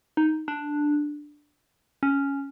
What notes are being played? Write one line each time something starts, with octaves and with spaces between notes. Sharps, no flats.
D#4
D4
C#4